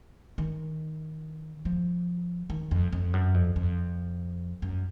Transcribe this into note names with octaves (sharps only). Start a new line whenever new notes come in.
D#3
F3
D#3
F2
F2
F#2
F2
F2
F#2